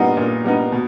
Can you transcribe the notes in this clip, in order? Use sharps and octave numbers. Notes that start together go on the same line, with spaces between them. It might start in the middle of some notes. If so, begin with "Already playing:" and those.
Already playing: A#2 G3 B3 D#4 F4 F#4
A#2
G3 B3 D#4
B2